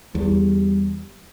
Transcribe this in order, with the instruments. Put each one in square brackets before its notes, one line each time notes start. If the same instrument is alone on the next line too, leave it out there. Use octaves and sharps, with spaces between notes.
[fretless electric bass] E2 [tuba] G3